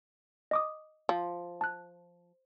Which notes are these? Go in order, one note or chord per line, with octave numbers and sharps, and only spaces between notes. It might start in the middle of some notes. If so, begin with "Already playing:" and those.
D#5 D6 D#6
F3
A5 F#6